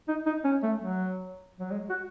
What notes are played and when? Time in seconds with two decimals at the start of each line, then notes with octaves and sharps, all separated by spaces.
0.08 D#4
0.26 D#4
0.44 C#4
0.63 A3
0.81 F#3
1.60 F#3
1.71 G#3
1.89 F#4